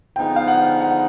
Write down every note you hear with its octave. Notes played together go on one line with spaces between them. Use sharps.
D3 F3 G#3 B3 D#4 G5
F5
F#5
F#5